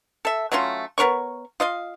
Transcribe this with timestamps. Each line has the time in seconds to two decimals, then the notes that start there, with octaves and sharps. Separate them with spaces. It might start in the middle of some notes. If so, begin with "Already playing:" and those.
0.25 A4 E5
0.52 F#3 A3 C#4 F4
0.98 B3 A#4 C#5 C#6
1.60 F4 D#5 F5